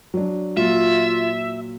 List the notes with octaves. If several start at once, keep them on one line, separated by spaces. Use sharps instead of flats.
F#3 D4
A#2 F#3 F4 E5